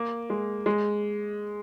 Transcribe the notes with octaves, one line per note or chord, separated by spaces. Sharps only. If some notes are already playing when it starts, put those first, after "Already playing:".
Already playing: A#3
G#3
G#3